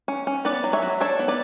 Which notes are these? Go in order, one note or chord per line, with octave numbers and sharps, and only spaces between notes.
C#4
C#4
B3 B4 D5
F#3
C#5 E5
F#3
D4 A4 C#5
B3
B4 D5